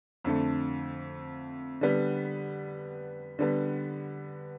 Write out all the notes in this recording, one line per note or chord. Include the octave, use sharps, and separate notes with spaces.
F2 D3 A3
D3 G3 B3
D3 G3 B3